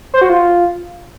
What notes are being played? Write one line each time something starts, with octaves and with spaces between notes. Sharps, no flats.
C5
F#4
F4